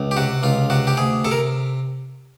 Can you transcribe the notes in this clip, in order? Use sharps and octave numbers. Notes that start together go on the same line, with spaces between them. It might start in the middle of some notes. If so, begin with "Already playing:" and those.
Already playing: C#2
G4
C3 F#4
C#2 F4
C3 F#4
G4
D2 G#4
C3 A4
A#4